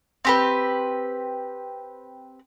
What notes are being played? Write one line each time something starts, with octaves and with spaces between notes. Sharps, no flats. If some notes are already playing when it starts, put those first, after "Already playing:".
C4 G4 B4